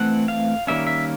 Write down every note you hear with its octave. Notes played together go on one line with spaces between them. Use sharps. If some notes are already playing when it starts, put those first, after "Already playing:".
Already playing: E3 A3 C4 F#5
F5
D#3 G3 A#3 C#4 E5
E5